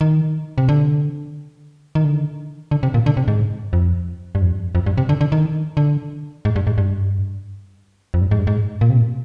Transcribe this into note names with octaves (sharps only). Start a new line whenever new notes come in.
D#3
C3
D3
D#3
D3
D3
C3
A#2
D3
C3
G#2
F2
G2
F2
F2
G2
C3
D3
D3
D#3
D3
G#2
G2
G#2
G2
F2
G2
G#2
G2
G#2
A#2
C3
A#2